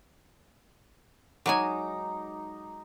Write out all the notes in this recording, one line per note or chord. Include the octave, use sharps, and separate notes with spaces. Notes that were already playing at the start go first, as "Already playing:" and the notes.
F#3 G#3 D#4 G#5 A#5 D6